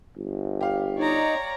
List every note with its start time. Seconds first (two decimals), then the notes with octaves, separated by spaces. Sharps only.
0.17 G1
0.61 G4 F5
0.97 D#4 C#5 D5 A#5